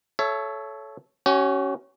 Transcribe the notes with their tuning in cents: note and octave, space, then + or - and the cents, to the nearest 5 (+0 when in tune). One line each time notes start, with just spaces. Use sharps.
A4 -20 C#5 +0 E5 +20
C#4 +0 F#4 +45